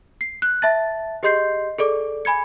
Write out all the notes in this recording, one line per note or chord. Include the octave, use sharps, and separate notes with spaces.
C7
F#6
E5 A5 A6
G4 G#4 D#5 C6 G6 C7
G#4 A4 D5 D6
G#5 B5 G#6 C#7